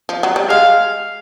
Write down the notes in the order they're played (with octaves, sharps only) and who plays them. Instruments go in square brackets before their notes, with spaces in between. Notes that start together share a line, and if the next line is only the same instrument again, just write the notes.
[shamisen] F3
F#3
G3
[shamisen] G#3 [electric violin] F5